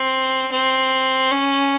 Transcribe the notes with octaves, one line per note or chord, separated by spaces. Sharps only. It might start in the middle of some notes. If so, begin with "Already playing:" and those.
Already playing: C4
C4
C#4